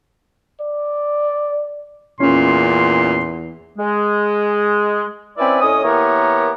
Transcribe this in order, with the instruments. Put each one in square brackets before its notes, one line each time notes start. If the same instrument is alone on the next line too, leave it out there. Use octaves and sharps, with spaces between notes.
[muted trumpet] D5
[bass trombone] E2 [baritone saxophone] A#2 [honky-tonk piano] C#4 [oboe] C6
[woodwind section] G#3
C4 C#4 E4 B4 D5
A2 C#4 C#5 D#5 D#6
E3 A#3 B3 G4 A#4 C#5